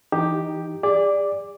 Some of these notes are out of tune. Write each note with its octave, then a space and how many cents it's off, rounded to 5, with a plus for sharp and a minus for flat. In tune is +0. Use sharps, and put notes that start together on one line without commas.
E3 +0 D#4 +0 G4 +0
G#4 -40 D5 +0 D6 +0